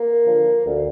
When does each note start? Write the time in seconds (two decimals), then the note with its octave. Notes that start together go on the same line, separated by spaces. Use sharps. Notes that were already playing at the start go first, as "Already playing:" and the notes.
Already playing: A#3
0.24 D3 F3
0.66 D2